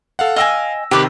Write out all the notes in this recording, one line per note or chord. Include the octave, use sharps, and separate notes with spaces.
A4 F5 F#5
D#5 F5 G5 G#5 E6 A#6
C3 D#3 G4 B4 D6